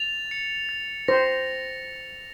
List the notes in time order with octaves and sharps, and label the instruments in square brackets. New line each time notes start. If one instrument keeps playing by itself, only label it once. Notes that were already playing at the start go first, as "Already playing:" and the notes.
Already playing: [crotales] A6 F7
C#7
A6
[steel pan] C5 [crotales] A#6